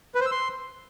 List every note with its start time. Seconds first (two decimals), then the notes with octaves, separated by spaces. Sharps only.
0.15 B4
0.20 C5
0.26 E6
0.32 C6